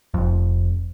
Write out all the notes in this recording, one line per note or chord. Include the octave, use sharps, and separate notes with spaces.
F1 F2